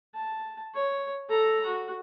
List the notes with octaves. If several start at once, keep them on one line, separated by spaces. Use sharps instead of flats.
A5
C#5
A4 A#5
F#4